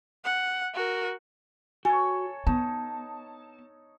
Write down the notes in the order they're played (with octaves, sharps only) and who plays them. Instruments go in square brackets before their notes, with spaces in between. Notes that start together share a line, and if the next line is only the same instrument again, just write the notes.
[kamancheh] F#5
F#4 A#4
[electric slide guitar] F#4 [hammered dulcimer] A4 C#5 [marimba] G#5
[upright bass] B3 [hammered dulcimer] D#4 [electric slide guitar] A5